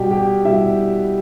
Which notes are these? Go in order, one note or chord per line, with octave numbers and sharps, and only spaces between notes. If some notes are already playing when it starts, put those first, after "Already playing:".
Already playing: B2 G3 G4 G5
G4 G5
B2 G3 E4 E5